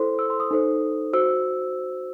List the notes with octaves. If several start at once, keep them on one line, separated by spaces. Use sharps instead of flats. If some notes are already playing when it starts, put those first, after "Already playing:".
Already playing: E4 A4 C5 C6
E6
C6
D#6
D#4 A4 C5
F#4 C5 E6